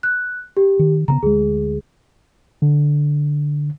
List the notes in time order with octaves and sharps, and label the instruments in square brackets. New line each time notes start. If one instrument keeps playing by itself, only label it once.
[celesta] F#6
G4
[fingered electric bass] D#3
[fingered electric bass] C#3 A3 B3 [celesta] A#5
[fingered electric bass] D2 G#3 [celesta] G#4
[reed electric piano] D3